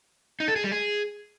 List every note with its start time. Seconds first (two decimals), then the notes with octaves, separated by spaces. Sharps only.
0.40 D#4
0.48 A4
0.56 G#4
0.64 G3
0.72 G#4